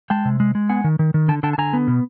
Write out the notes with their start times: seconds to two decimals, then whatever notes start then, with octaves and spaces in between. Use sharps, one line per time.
0.10 G#3 G5 A5
0.25 C3
0.40 G#3
0.55 G#3
0.69 B3 F#5 G#5
0.84 D#3
0.99 D#3
1.14 D#3
1.28 D3 G5 A5
1.43 D3 G5 A5
1.53 A5
1.58 D3 G#5 A#5
1.73 B3
1.88 B2